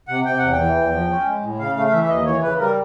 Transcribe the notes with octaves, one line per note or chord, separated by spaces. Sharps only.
C3 F#5
C3 G5
E2 F#5
G5
E3
E2
F3
C#4
G#3
A2
C#3 F5
A3 F5
F5
E3 E5
E5
D#2 D#5
E3 C#5
C#3 B4
G3 A#4